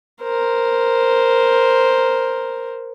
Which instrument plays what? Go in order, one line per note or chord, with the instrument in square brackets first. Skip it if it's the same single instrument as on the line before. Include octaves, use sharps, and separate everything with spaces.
[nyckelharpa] A#4 C5